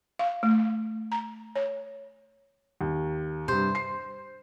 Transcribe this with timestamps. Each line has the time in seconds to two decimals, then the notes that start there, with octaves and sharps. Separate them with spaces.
0.19 F5
0.43 A3
1.12 A#5
1.56 C#5
2.81 D#2
3.48 G2 C3 C5
3.75 C7